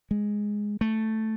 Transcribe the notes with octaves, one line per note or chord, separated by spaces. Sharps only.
G#3
A3